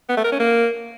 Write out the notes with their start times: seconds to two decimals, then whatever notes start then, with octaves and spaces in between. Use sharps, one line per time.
0.09 B3
0.17 A3
0.24 A#4
0.32 C#4
0.40 A#3